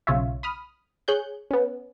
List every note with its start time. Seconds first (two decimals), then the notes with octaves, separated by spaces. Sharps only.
0.07 B1 C#3 F4 C#5 E5
0.43 B5 D#6 F6
1.08 G#4 C#5 F#6 G6
1.51 B3 C#4